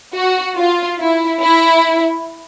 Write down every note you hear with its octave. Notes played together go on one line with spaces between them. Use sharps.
F#4
F4
E4
E4